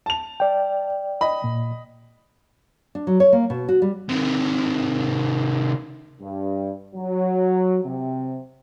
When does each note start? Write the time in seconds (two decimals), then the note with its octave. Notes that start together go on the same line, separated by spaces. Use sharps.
0.06 A5 F7
0.40 D5 G5
1.21 D#5 B5
1.44 A#2
2.95 D4
3.07 F#3
3.20 C#5
3.33 A#3
3.50 B2
3.69 F#4
3.82 G3
4.09 C3 D#3
6.21 G2
6.95 F#3
7.85 C3